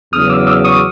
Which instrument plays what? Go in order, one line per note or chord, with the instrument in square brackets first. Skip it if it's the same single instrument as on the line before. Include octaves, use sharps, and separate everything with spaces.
[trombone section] E2 C#3 F#3 [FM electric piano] D#6 F6
[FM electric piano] D6 E6
D6 E6
C#6 D#6